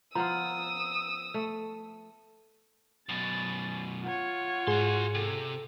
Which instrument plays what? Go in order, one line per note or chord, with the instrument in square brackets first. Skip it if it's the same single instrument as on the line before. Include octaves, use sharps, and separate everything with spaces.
[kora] F3 B3 F4 [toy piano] A#5 [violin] D#6 E6
[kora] A3
[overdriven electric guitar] F#2 B2 [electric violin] A6
[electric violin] F4 C#5 [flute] F#5
[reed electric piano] G#2 G#4 [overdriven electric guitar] F#4 C6
[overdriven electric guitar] C3 [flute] A4